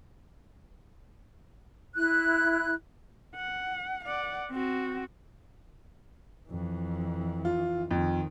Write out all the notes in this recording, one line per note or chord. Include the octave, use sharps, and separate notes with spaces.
E4 F#6
F#5
D5 F#5
C4 F#4
F2 E3
F4
F2 D#3